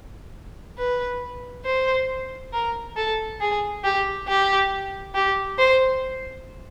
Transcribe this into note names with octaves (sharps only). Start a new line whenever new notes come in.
B4
C5
A#4
A4
G#4
G4
G4
G4
C5